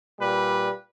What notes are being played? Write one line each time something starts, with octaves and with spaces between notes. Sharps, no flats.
A#2 G3 B4